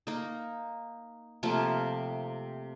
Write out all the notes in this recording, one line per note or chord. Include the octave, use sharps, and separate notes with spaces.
A#3 D#4
C3 F3 A3 A#3